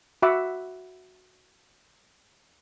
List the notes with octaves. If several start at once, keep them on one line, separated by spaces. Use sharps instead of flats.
F#4 E5 F#5 B5 D6